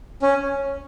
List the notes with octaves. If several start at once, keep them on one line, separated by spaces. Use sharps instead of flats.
C#4